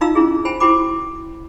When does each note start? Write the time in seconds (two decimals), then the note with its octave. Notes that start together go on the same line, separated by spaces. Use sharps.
0.01 D#4 F4 D#5 F5 A#5 E6
0.15 C#4 D4 E4 G#4
0.45 C5 G5 G#5 B5
0.60 E4 F#4 C5 G5 B5 D6